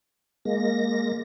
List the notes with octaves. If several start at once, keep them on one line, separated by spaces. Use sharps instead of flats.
G#3 A#3 A#6